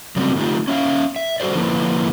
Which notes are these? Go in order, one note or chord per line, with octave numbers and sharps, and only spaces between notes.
C#3 F#3 G3 A3 C4
D3 A3 D#4 F4 G4
C#4 E5 F5
E5
G3 F#4 A4 C5 D5
D3 F3 A#3 E4 B4